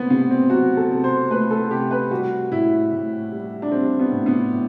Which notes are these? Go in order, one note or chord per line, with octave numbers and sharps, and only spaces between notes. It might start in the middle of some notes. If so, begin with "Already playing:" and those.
Already playing: C3 A3 B3 C4
C3 B3
C4
F#3 F#4
A4
C3
C5
A3 B4
A4
C3 G4
B4
G3 F#4
A2 E4
A2
G3
D4
G3 C4
B3
A2
B3
A2